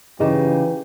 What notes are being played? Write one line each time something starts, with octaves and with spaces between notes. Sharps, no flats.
C#3 E3 D#4 G4 G#4 D#5 A#5